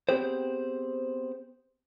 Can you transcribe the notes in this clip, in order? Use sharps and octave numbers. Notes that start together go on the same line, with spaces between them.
B3 C4 G4 G#4 C5